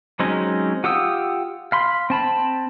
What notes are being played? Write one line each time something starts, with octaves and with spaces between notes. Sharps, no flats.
F#3 G#3 C4 C#4 D#4
F4 G4 F#5 D#6 E6
F5 B5 C6
C4 A5 B5